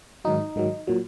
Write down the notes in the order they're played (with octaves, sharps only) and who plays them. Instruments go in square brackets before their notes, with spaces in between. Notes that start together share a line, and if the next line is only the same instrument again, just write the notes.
[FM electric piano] G#2 D#3 F#3 D#4
G#2 D#3 F#3
A#2 F#3